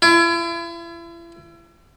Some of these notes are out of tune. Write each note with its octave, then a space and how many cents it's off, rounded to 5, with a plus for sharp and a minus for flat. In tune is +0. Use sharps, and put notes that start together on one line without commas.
E4 +40